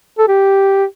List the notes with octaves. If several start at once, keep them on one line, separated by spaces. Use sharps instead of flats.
A4
G4